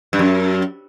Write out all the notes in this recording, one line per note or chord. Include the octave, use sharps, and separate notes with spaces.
G2
F#2